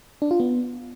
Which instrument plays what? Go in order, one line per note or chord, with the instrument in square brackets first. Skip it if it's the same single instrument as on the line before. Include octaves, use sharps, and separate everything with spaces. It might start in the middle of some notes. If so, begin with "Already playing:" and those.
[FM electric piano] D4
F4
B3